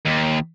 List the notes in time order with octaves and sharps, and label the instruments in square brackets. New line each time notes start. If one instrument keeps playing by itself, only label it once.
[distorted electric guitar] D#2